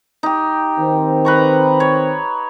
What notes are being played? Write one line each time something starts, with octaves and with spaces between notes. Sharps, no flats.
D#4 G4
D#3 C4
B4 A#5 C#6
C#5